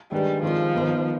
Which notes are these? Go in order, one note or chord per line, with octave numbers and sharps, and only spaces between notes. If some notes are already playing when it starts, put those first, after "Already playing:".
D#3 G3 G#3 D4 G4 B4
D#3 F3 G#3 C4 F4
D#3 B3 D#4